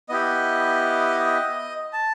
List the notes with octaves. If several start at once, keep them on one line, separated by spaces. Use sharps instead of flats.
B3 E4 G4 D#5
A5